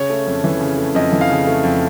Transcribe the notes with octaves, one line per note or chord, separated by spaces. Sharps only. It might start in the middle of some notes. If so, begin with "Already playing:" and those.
Already playing: C#3 C#5
A3
F2
E3
C#3
A3
F2 D#5
E3
F5
C#3
A3
F2